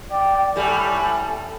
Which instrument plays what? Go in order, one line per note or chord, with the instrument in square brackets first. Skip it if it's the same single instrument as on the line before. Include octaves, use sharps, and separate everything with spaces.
[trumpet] D5 [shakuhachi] G5
[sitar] A2 G3 [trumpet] A4 [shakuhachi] G#5